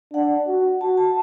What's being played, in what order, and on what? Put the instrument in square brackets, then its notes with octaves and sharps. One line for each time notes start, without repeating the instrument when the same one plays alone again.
[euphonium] D4 [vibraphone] F#5
[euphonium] F#4
[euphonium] F#4 [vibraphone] A5
[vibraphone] A5